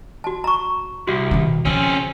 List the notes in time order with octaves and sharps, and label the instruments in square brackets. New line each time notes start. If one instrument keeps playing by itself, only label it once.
[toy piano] F#4 A5
A#5 C#6
[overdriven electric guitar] C2 [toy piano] F#4
[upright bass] B2 D#3
[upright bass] C#3 F3 [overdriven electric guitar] C4 C#4